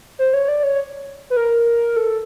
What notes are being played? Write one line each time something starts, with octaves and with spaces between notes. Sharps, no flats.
C5
C#5
D5
C#5
B4
A#4
A4